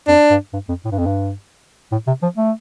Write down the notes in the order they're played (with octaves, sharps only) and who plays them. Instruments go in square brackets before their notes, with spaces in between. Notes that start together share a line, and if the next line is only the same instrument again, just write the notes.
[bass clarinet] F2 [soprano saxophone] D4
[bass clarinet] G2
G2
F2
A2
G2
F2
G2
A2
C3
F3
A3